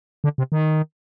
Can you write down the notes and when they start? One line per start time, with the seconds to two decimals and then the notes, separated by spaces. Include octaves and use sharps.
0.24 D3
0.38 C3
0.52 D#3